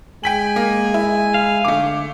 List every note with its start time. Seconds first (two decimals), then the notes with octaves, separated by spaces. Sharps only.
0.24 G#3 G5 G#5 B6 F#7
0.56 A#3
0.94 E4
1.34 F5
1.65 D3 A3 D6